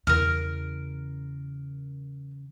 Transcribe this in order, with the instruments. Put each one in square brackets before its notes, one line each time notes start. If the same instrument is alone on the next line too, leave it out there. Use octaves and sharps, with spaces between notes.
[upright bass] E2 C#3 [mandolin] A#4 F6